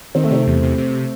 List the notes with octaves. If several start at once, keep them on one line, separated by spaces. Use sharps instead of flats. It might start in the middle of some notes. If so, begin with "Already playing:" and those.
D#3 C4
A3
C3 C4
E2
C3
C3